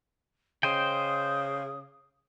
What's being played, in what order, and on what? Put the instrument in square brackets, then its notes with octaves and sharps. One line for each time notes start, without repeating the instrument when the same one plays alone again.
[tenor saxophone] C#3 [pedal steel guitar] C5 D#5 G5 [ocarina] D#6